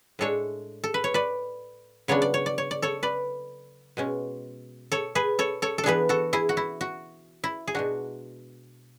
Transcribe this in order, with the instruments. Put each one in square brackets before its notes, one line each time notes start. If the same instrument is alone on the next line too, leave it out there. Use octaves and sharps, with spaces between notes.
[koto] A2 G#3 D4 A4 C#5
A4
B4
C#5
B4 D5
C#3 F#3 B3 D4 C#5
D5
C#5
D5
C#5
D5
A4 C#5
B4 D5
B2 G#3 C#4
A4 C#5
G#4 B4
A4 C#5
A4 C#5
A4
E3 B3 D4 G#4 B4
F#4 A4
E4 G#4
F#4
E4
F#4
E4
G#4
B2 G#3 D4 F#4